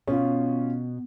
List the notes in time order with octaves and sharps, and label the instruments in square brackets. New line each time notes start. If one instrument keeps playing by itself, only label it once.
[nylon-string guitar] B2 [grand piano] C#4 F4